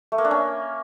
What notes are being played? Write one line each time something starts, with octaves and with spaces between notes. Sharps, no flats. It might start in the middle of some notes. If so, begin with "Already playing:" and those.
A3
A#3
D4
C#4